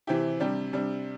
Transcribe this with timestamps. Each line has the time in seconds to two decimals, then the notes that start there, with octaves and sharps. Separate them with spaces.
0.07 C3 E3 C4 E4 G4
0.40 C3 G3 D4 G4
0.73 C3 G3 D4